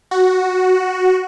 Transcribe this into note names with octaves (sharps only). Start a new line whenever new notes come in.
F#4